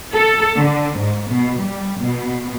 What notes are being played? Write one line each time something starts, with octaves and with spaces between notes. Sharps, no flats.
A4
D3
G#2
B2
G3
B2